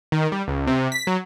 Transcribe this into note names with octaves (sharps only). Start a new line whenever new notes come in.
D#3
G3
C#2
C3
B6
F#3